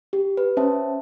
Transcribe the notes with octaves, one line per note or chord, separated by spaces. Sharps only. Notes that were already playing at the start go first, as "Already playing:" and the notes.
G4
B4
C#4 C5 E5 A5